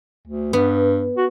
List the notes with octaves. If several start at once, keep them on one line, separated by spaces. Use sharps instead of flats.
D2
G2 B3
F#4